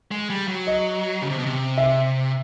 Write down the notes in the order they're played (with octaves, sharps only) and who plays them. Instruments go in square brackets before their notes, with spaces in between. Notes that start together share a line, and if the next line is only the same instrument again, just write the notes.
[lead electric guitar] G#3
G3
F#3
[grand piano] D#5
[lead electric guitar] C#3
C3
B2
C3
[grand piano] E5